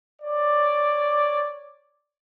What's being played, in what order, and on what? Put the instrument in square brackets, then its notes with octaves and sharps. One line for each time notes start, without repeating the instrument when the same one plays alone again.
[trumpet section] C#5 D5